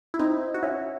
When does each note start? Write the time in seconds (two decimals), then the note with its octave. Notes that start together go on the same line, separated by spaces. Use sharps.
0.14 E4
0.19 C4 D#4
0.54 F#4
0.63 C#4 E4